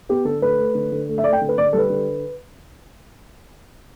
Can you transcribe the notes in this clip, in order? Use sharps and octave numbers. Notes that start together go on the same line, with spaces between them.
B3 G4
D3 A4
A3 B4
A3
D3
D3
A3
E5
A3 D5
G5
D3
B4
D3 D5
G3 A4
B4
D3